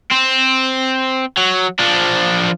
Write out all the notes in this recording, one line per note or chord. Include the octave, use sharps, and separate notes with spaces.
C4
F#3
F3 D4